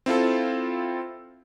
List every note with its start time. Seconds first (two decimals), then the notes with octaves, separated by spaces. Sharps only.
0.06 C4 E4 F4 A4